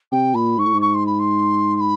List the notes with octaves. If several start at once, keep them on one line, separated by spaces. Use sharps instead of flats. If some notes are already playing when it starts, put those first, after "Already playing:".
C3 G5
A#2 B5
G#2 C#6
A2
G#2
C#6
C6
B5
C6
C6
B5